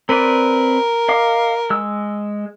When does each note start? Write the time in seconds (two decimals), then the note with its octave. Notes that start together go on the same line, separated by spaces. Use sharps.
0.09 C4 A#4 B4 D5
1.09 D#5 F5 D6
1.70 G#3 E6